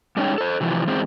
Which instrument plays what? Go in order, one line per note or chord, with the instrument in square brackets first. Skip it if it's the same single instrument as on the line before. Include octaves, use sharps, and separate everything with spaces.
[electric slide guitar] G3 G#3 C#4 D#4 C#5 G5
A4 C5
C3 E3 F3
E2 G#3 C4